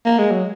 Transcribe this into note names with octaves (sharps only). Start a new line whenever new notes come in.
A#3
G#3
F#3